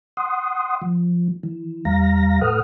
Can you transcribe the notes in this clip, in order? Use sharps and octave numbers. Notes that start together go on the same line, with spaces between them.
F#5 C6 D#6
F3
E3
E2 G3 F5 A#5 A#6
A2 A4 B4 F#5 D#6 F6